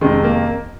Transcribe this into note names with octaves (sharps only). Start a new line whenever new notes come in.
F2 C3 D#3 G#3
A#3